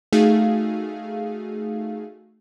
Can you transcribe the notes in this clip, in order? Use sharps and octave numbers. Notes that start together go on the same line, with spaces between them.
A3 D#4 F#4 G#4 F5